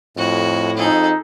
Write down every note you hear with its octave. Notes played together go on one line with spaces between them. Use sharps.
F2 A2 F#4
F2 D#4 G#4 A4